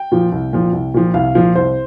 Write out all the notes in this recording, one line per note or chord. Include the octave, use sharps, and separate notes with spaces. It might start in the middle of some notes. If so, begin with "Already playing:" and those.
Already playing: G5
A#2 F3
C2
A#2 F3
C2
A#2 F3
C2 F5
A#2 F3
C2 C5